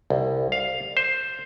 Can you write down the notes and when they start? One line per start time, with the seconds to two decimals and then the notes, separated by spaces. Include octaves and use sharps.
0.10 C2
0.52 F5
0.97 C5